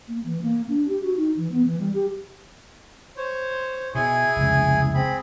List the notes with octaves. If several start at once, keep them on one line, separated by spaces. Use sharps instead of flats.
A#3
E3
A#3
D4
G4
F#4
D#4
E3
B3
E3
G3
G4
C5 C#5
B2 E4 G#4 G#5
F1 C#2
C4 G#4 B5